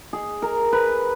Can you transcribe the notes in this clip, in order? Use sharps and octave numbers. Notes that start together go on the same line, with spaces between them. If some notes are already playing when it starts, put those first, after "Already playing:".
G#4
A#4
B4